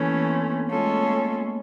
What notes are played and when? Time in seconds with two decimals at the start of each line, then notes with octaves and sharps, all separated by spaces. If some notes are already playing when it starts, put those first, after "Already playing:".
Already playing: E3 A3 A#3 C#4
0.09 B3
0.29 C4
0.49 B3
0.69 G#3 A3 C#4 F4 A4
0.83 A#3
0.96 B3